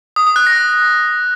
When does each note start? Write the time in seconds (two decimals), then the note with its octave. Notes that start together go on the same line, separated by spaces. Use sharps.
0.16 D#6
0.27 D#6
0.36 F#6
0.47 A#6